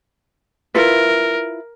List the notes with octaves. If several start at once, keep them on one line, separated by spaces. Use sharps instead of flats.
E4 F4 A#4 B4